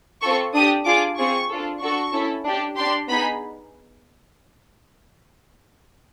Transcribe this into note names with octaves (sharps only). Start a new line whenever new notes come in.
C4 F4 A4 C#6
D4 G4 D#6
D4 F4 G#4 D6
C4 F4 G#4 C#6
D4 F4 A4
D4 F#4 A4 C#6
C#4 E4 A4
D4 G4
D4 G4 C6
B3 D#4 G#4 B5